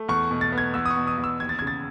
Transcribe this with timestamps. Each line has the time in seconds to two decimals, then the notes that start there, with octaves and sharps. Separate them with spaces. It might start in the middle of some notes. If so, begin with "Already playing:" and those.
Already playing: A3
0.08 E2 C#6
0.31 B2
0.41 A6
0.52 B3
0.58 G#6
0.74 E2 E6
0.86 D#6
0.91 C#6
0.97 B2
1.07 D#6
1.18 E2
1.24 E6
1.40 D#2 G#6
1.49 A6
1.59 C#3 G#6
1.67 A6